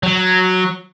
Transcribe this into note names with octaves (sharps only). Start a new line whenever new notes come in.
F#3